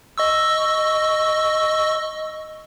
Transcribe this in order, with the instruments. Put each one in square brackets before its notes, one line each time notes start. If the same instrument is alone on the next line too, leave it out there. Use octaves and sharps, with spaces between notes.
[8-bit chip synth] D#5 C#6 E6